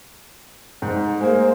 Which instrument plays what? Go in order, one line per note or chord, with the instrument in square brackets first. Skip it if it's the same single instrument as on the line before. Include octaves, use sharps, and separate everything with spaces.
[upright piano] G#2
[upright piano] G#3 A#3 [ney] C5